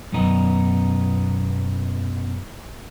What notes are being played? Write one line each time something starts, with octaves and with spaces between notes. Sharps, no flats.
B1 F#2 B3 D#4